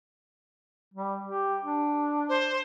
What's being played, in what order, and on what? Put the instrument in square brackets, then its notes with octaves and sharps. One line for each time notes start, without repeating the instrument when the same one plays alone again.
[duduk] G3
G4
D4
[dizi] C5